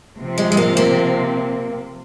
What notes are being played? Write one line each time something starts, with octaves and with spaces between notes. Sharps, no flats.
C3 F3 C4
G#3
G#3
A#3
A#3